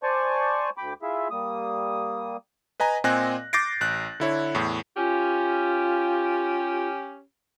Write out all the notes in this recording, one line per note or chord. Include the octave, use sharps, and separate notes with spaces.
C5 D5 G#5 A5 C#6
D2 G5 B5 D6
E4 F4 G#4 E5
G3 A#3 D#6
B4 D#5 G#5 A#5
A#2 C4 D#5 G#5 F#6 A#6
D6 G6 A6 A#6 C7 D7
A1 F#6
D3 E4 C#5
E2 A2
C#4 F4 G4